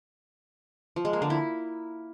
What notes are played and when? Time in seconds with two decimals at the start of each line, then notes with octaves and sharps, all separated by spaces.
0.96 F3
1.05 G#3
1.13 A#3
1.22 D3
1.30 E4